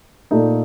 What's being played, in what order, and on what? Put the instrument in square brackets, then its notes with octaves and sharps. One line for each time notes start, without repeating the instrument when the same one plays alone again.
[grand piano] A#2 A3 D#4